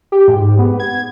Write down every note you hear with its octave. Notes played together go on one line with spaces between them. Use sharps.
G4
G#2
B3
G#6